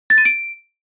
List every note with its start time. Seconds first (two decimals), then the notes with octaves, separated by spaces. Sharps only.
0.10 A6
0.18 D#7
0.25 D7